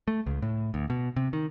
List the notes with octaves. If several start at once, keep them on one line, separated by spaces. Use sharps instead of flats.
A3
C#2
A2
D2
B2
C3
D#3